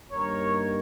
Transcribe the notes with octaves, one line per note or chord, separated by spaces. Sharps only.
G2 D#3 G3 A#3 A#4 C#5